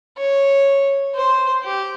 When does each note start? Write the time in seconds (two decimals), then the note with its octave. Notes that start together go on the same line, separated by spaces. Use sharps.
0.18 C#5
1.15 C5
1.64 G4